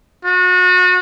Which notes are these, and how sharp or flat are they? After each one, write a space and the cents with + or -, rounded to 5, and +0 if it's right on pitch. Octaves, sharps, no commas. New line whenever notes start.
F#4 -35